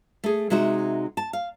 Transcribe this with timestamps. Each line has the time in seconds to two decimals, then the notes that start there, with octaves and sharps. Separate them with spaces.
0.24 A3 G#4
0.50 C3 G#3 D#4 F#4 E5
1.17 A5
1.33 F5